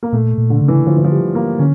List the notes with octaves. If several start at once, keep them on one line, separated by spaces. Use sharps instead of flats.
A#3
A#2 A3
A#2
D3
C#3
E3
D3 F3
E3
F3
G3
A#3
D3 C#4